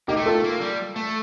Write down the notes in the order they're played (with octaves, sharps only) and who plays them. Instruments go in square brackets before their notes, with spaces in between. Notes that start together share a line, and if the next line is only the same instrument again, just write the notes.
[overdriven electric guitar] A#3 [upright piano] D#4 G4
[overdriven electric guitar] A3
[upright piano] F4 A4
[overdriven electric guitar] A#3
G3
A3